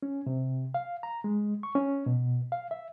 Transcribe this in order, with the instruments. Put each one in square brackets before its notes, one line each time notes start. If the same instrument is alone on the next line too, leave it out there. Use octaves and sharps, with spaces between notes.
[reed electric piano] C#4
C3
F5
A#5
G#3
C#6
C#4
B2
F5
E5